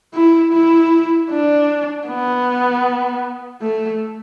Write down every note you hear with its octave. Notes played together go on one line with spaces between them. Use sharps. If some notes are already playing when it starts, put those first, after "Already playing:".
E4
E4
D4
B3
A3